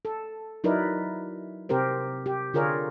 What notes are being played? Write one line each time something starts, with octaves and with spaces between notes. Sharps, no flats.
A4
F#3 D#4 E4 A#4 B4 D5
C3 C4 G4 A#4 C5
G4
D3 F4 G#4 A#4 C#5 D5